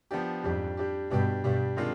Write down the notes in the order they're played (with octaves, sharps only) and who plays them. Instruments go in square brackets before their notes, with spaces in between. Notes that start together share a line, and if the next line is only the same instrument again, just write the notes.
[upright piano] F3 B3 D4 G4
[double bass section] F2 G#2 [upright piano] G3 D4 G4
[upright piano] G3 D4 G4
[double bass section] G2 B2 [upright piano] G3 D4 G4
[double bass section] G2 B2 [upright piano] G3 D4 G4
[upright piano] C3 D#3 G#3 D4 F4